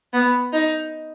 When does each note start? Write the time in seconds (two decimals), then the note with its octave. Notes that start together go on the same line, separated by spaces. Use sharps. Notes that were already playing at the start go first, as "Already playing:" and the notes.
0.14 B3
0.53 D#4